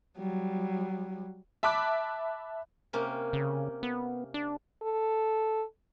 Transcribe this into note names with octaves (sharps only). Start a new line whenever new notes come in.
F#3 G3
E5 A5 B5 D6 F#6
C3 A#3 C#4
C#3
B3
D4
A4